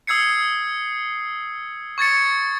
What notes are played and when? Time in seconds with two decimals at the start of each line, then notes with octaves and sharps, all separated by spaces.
0.07 D#6 E6 G#6 C7 C#7
1.98 C#6 G#6 A6 C#7